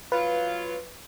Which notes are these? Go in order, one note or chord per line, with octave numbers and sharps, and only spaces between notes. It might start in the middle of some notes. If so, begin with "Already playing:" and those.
F#3 F4 B4